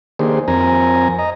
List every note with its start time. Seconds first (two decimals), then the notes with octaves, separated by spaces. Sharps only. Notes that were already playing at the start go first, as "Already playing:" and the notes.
0.19 D#3 A#3 D4 G4 G#4 C5
0.48 F2 C4 A#4 G#5 A#5
1.19 D#5 A#5